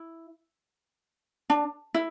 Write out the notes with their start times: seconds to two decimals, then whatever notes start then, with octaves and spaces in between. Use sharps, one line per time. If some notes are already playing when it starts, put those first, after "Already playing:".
Already playing: E4
1.50 D4
1.94 E4